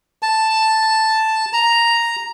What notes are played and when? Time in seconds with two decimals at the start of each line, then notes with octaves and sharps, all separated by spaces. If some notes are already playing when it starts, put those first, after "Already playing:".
0.23 A5
1.53 A#5